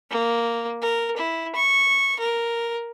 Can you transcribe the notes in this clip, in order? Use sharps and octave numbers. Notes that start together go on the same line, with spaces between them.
A#3
A#4
E4
C#6
A#4